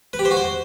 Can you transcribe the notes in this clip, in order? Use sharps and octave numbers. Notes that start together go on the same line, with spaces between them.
B4
G4
C5
F#4
C5